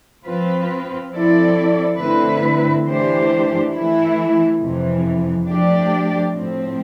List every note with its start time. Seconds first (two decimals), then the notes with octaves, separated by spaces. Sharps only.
0.24 F3 C4 F4 B4
1.11 F3 C4 E4 A4 D5
1.98 D3 A3 C4 E4 B4
2.86 E3 A3 D4 G4 C5
3.72 E3 A3 E4
4.59 F2 C3 E3
5.46 F3 A3 D4 G4 D5
6.33 A2 F3 C4